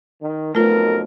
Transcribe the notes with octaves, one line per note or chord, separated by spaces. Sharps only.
D#3
B1 F2 B2 A3 F4 A#4